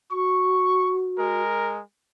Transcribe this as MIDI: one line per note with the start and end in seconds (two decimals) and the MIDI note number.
0.11 1.42 66
0.11 0.98 85
1.18 1.81 56
1.18 1.81 70